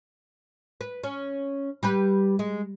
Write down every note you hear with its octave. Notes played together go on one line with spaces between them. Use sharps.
B4
C#4
G3 G4 B4
G#3